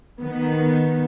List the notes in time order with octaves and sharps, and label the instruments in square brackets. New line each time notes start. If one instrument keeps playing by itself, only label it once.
[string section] D#3 B3